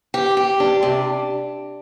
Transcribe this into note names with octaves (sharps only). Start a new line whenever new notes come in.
G4
G4
D4
C3